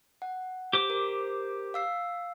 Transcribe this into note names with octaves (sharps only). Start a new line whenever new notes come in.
F#5
G4 C5 D6
A#4
F5 E6 C7